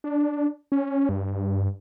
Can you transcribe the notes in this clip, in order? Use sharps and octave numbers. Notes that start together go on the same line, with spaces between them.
D4
C#4
G2